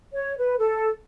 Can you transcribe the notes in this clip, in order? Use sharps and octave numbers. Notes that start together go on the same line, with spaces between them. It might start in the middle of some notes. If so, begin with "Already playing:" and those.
C#5
B4
A4